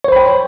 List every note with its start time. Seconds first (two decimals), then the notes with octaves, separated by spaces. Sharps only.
0.04 C#5
0.08 C5
0.12 B5
0.16 G5